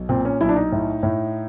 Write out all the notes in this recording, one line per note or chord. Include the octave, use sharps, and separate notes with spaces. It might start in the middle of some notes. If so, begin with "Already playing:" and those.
Already playing: B1
A#2 C4
C#4
B1 E4
D4
D#4
A2
A2